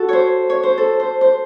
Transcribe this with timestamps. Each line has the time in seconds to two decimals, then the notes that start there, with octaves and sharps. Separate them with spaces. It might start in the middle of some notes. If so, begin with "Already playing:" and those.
Already playing: F#4 A4
0.09 C5 C#5
0.50 C#5
0.63 C5
0.78 A4
1.00 C5
1.21 C5